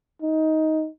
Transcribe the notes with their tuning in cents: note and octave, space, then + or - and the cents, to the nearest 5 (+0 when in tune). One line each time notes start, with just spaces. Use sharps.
D#4 +15